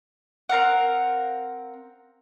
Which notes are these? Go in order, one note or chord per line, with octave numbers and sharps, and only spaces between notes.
C4 A#4 F5 F#5